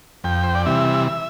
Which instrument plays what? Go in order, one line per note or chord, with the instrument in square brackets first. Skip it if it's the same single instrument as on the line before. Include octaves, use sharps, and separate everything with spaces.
[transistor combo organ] F2 G5
C5
D5
C3 E3 G3 E5
E5